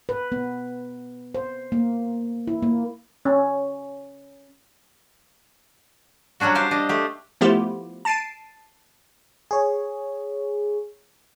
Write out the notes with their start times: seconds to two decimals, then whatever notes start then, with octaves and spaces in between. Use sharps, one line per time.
0.09 B4
0.32 B3
1.35 C5
1.72 A#3
2.47 E4
2.63 A#3
3.25 C#4
6.40 F#3 G3 C#4 D4 F#4
6.55 G4 C5 F5
6.71 D4 D#5
6.89 A3 G4
7.41 F3 A3 B3 E4 F4 G4
8.05 A5 A6 C7 D7 D#7
9.51 G#4 C#5